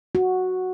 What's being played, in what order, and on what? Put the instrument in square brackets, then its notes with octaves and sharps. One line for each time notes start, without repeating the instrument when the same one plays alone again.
[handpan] F#4